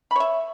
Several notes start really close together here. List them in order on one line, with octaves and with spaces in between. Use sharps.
B5 C#5 E5